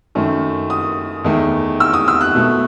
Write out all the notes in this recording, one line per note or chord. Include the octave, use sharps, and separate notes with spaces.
F#2 D#3 A3
D#6
E2 D#3 A3
E6
D#6
E6
F#6
B2 A3